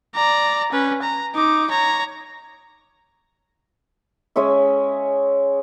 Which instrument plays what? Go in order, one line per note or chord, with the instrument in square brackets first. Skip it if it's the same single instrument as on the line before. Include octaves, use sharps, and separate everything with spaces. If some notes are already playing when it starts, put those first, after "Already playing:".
[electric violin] D5 A#5
C#4 B4
A#5
D#4 D6
C#5 A#5
[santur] G#3 C#4 C#5 E5